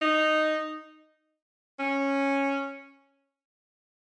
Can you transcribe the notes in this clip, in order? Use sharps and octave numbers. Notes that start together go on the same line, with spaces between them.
D#4
C#4